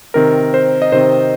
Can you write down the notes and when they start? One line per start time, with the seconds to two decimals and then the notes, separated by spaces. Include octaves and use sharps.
0.14 C3 D#3 C4 A#4
0.54 C5
0.82 D#5
0.92 C3 D#3 C4 C5